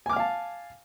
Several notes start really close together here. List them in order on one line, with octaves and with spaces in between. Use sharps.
G#5 D6 F6 F5 A5